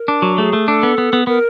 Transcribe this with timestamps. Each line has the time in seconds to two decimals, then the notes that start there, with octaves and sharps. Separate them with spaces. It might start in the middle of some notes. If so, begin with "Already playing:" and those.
Already playing: A#4
0.08 D4
0.22 F#3
0.38 A3 G#4
0.53 A3
0.67 D4 A4
0.83 B3
0.98 B3
1.13 B3
1.27 B3 A#4